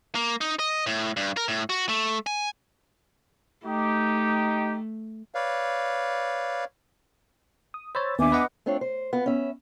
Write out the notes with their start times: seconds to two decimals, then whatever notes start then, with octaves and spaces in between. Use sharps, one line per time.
0.15 A#3
0.41 D#4
0.59 D#5
0.86 A2
1.17 G2
1.37 A#4
1.48 A2
1.69 F#4
1.89 A3
2.27 G#5
3.65 A3 D#4 G4
5.34 B4 C#5 D5 F5
7.74 D#6
7.95 C5 C#5 B5 E6 A6
8.19 D#2 B3 D4 E5 G#5 D6
8.32 B4 D#5 F#5
8.66 A3 C4 D4 F4 C#5
8.81 C5
9.13 B3 F4
9.26 C#4 E5